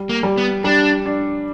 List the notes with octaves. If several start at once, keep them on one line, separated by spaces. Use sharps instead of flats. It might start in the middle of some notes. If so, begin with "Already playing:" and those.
Already playing: G3
A#3
G3
B3
G3 D4
D4